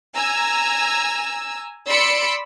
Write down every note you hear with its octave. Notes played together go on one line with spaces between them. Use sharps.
G#5 A#5 E6
D5 B5 C6 E6 C#7 D7